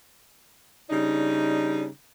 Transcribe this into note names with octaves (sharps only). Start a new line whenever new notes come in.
C#3 G3 D4 D#4